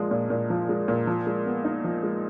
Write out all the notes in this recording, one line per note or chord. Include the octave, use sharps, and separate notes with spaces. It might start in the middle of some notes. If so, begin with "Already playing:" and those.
Already playing: A#2 F3 G#3
A#2
A#2
F3
G#3
A#2
F3
G#3
B3
D#4
F3
G#3